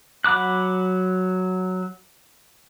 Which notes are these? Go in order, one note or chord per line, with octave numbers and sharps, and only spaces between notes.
F#3 F#5 B5 D6 F#6